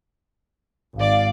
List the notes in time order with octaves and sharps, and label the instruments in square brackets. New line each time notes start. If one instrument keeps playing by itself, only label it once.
[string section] G#1 D5 [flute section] F5